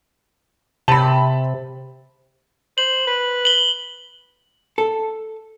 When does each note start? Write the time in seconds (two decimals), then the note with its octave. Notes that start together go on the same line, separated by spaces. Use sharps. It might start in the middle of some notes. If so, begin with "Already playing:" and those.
0.88 C3 A5 B5
2.78 C5 F#7
3.07 B4
3.45 F#7 G7
4.78 A4